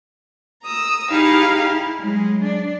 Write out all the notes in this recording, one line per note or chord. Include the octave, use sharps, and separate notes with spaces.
A#5 D#6 E6
D#4 E4 G4 G#4 F5
E4
F#3 G#3
D4